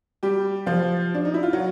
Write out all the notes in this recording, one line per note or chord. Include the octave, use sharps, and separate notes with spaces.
G3 G4
F3 F4
D4
D#4
E4
F4
F#3 F#4